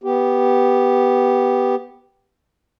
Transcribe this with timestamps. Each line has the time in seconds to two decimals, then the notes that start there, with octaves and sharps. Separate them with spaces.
0.04 B3 G4